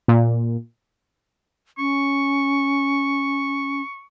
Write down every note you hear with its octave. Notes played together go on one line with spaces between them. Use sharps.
A#2
C#4 C#6